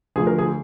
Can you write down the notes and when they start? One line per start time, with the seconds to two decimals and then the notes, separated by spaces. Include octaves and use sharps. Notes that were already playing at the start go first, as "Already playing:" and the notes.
0.16 D2 D3 F3 G#4
0.27 A#4
0.38 G#4